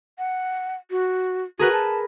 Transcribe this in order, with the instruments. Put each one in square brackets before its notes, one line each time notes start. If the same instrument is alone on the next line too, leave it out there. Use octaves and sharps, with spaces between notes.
[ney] F#5
F#4
[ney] F#4 [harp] G#4 A#4 B4
[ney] A5